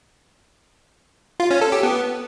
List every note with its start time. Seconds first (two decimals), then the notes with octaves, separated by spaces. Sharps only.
1.40 F4
1.51 C#4
1.61 A4
1.72 G4
1.83 B3